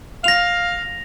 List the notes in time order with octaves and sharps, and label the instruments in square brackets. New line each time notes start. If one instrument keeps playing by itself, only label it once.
[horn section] F5 [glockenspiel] A#6 F7